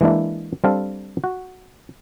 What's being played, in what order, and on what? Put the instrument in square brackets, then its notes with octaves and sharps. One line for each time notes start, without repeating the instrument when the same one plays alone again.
[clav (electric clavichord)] E3 G#3 A#3 D4 E4
G3 C4 D4 A4 F5
F#4